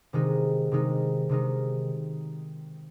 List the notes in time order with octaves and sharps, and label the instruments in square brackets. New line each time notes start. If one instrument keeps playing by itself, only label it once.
[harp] C3 D#3 G#3 D#4
C3 D#3 G#3 D#4
C3 D#3 G#3 D#4